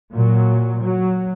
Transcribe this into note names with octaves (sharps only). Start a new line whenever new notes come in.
A#2 F#3
F#3